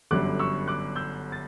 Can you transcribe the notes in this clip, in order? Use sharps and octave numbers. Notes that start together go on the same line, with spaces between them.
G1 F#2 D3 G3 D6 F#6
C#6 E6
D6 F#6
E6 G6
A6